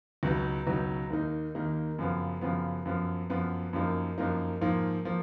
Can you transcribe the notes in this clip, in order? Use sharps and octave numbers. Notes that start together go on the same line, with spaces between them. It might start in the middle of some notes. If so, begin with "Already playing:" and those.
C#2 B2 F#3 B3 D#4
C#2 B2 F#3 B3 D#4
D#2 D#3 A#3 D#4
D#2 D#3 A#3 D#4
F#2 C#3 F3 B3
F#2 C#3 F3 B3
F#2 F3 B3
F#2 F3 B3
F#2 F3 A#3 D#4
F#2 F3 A#3 D#4
G#2 F3 A#3
F3 A#3